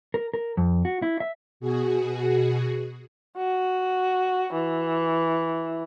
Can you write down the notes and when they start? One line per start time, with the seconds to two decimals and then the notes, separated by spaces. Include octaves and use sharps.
0.14 A#4
0.34 A#4
0.57 F2
0.85 F#4
1.02 E4
1.20 E5
1.60 B2 F#4 G#4
3.38 F#4
4.53 E3